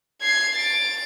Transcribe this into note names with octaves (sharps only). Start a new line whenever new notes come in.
G#6 C7
A6 D7